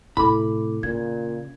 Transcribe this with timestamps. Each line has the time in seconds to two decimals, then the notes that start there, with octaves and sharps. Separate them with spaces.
0.17 A2 C3 E4 A4 B5 D6
0.83 A#2 C#3 G#6